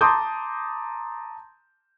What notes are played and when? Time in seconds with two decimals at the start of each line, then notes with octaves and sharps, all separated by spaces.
0.01 A5 A#5 C6 D6 D#6 G6